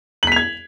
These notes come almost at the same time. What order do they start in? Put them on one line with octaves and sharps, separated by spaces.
F#7 B6 F7 G#6